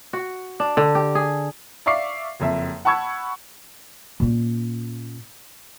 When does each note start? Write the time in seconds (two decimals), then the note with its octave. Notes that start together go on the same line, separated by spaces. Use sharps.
0.13 F#4
0.60 D4
0.77 D3
0.95 G4
1.15 G#4
1.86 D5 E5 F5 C#6 D6 C7
2.40 F#1 F2 E5
2.85 F#5 A5 B5 C#6 E6 G#6
4.20 A#2 C#4